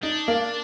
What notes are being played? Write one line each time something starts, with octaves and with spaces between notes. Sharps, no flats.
D4 D#4
A#3